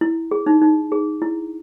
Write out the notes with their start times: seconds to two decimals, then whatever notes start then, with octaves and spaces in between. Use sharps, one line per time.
0.01 E4
0.31 G#4
0.46 D#4
0.62 D#4
0.92 G#4
1.22 E4